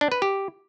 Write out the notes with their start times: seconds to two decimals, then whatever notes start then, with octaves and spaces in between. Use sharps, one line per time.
0.01 D4
0.12 B4
0.22 G4